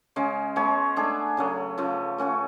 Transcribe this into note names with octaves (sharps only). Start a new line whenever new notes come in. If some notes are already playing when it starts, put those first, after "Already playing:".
C#3 G#3 C#4
G#3 B3 F#4 C#5
A3 D4 G#4
C#3 F#3 A3
C#3 F3 A3
A3 C#4 F#4 C#5